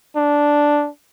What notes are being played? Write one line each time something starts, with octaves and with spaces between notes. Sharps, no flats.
D4